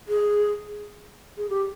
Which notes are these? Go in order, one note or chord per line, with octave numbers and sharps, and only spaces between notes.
G#4
G#4
G4